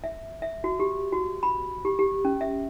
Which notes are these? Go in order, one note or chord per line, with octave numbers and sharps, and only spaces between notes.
E5
E5
F#4
G4
F#4
B5
G4
G4
C#4
E5